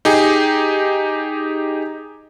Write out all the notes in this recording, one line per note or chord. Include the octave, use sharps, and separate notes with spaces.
D#4 G4 G#4